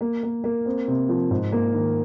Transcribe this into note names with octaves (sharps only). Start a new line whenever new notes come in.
A#3
A#3
A#3
C4
C3
F3
G#2
A#3
D#3